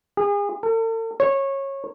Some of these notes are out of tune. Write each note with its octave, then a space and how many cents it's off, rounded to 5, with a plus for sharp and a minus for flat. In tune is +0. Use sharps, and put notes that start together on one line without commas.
G#4 -35
A4 +45
C#5 -20